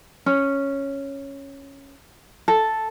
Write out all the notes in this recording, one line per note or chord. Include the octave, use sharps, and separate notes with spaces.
C#4
A4